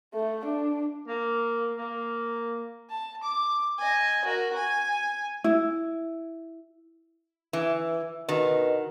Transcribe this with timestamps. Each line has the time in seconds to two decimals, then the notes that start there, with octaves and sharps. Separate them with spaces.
0.14 A3
0.45 D4
1.08 A#3
1.77 A#3
2.89 A5
3.23 D6
3.78 D#5 G#5
4.24 F#4 A#4
4.56 G#5
5.44 E4
7.53 E3
8.29 B2 D#3